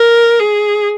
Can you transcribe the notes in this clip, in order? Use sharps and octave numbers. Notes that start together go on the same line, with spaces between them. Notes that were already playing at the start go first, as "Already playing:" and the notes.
Already playing: A#4
G#4